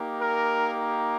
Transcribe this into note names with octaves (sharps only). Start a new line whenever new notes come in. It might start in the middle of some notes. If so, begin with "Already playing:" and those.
Already playing: A#3 D#4 G4
A#4